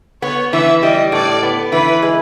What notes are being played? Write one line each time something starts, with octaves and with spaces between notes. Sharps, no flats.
B3 C#5
E3 E5
G3 D#5
A2 D5
B3
E3 B4
G#3